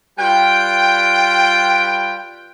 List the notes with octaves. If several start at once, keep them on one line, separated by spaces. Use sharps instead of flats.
G3 F4 B4 G5